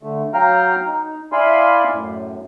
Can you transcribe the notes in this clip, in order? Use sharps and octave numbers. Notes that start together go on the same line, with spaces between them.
D3 A3
F#3 F5 G5 A#5 F6
D#4
E4 D5 F5 G#5 B5 C6
F#2 A2